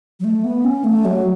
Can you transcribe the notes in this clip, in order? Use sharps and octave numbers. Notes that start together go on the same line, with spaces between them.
F#3
A3
B3
C#4
A3
F#3